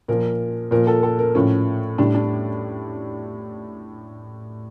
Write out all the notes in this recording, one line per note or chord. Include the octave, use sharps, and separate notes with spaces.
A#2 F3 A#4
A#2 F3 A#4
A4
A4
A#4
A2 F3 C#4
A2 G3 D4
D4